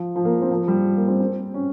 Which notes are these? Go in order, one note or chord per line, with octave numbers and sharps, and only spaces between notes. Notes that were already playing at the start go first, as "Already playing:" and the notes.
Already playing: F3
F3
A#3
C4
F3
G3
A#3
C4
C4
C#4